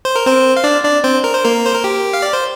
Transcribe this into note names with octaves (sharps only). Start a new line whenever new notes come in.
C5
A#4
C4 C5
F5
D4 D5
D4 D5
C4 C5
A#4
C5
A#3 A#4
C5
A#4
G4
F5
D5
C5